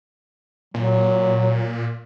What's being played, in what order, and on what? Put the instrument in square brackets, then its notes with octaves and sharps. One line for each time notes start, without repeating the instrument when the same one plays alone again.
[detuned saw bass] A#2 [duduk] F#3